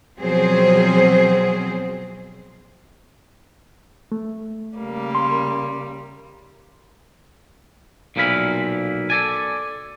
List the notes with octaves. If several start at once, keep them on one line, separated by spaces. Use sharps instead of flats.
B2 F3 F#3 C4 G#4 C5
A3
C#3 G3 A#3
C6
B1 A#2 F3 E4 F5 B5
A4 D5 G#5